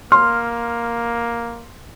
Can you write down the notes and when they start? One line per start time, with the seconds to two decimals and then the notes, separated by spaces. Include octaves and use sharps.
0.12 A#3 C6 F6